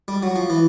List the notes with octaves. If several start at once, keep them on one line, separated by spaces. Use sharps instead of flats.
G3
F#3
F3
E3